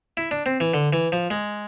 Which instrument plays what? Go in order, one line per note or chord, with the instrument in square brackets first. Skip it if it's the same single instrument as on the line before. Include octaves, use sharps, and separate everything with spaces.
[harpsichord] E4
D4
C4
E3
D3
E3
F3
G#3